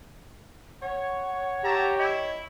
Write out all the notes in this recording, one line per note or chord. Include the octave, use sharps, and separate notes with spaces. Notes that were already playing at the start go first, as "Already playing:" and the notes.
C#5 F#5
G4 E5 A5 A#5
E4 D#5